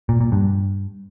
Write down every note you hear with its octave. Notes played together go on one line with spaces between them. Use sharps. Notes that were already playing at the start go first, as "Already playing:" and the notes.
A#2
A#2
G2